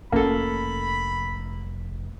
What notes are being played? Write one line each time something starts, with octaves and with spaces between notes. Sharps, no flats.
F1 A3 A#3 C#4 A4 B5